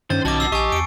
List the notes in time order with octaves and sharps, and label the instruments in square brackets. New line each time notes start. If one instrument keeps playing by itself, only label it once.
[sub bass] G2 [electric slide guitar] D#3 C#4 [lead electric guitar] C5 [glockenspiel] A6
[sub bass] B1 [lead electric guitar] F#4 D#5 [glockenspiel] A5 D6
[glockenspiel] E6 C7
[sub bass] A#1 [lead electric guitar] G4 [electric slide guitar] D#5 [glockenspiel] G#5 C#6
[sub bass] E2 [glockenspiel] C#7 D7